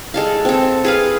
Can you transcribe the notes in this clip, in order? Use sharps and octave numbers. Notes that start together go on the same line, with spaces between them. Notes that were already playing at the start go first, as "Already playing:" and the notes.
G#3 A4 F5
C4 A4
G#4 B4 F5